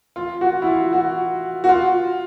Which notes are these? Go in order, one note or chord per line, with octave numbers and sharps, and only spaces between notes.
F4
F#4
E4
F4
F#4
F#4
F4